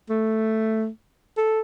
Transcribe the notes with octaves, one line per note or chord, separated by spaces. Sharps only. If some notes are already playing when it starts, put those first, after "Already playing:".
A3
A4